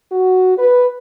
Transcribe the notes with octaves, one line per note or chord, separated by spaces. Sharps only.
F#4
B4